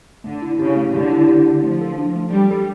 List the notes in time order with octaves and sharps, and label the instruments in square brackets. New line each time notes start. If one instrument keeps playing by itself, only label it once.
[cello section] D3 [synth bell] A3
[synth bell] E4
[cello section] C#3 [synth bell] G4
[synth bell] A3
[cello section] D3 [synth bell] G4
[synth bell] E4
G4
G4
[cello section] F3 [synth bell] A3
[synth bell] A4
D4
A3
[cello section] G3 [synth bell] D4
[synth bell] A4